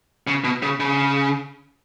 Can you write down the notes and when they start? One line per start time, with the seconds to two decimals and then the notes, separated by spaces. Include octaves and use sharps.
0.27 C#3
0.44 B2
0.62 C#3
0.80 C#3